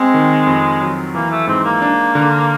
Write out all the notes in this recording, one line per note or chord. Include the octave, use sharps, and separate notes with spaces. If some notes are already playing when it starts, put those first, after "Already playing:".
Already playing: G#3 C4
D#3
F2
F#3
E3 A#3
A3
G#2 C4
A#3
D4
D3